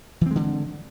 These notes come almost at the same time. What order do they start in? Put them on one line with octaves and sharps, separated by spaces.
E3 C4 G#3 D3